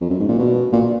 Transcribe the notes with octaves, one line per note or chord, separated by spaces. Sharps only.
F2
F#2
G#2
A#2
B2
A#2